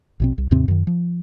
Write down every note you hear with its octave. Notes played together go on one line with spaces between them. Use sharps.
A#1 B2 C4
C2
D#2 G#2 C3 C4
F#2 D#3
F3